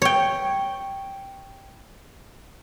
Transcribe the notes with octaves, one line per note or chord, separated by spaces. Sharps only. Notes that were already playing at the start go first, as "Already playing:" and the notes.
C#5 G5